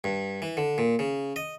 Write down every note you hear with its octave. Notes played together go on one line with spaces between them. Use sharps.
G2
E3
D3
A#2
C#3
D#5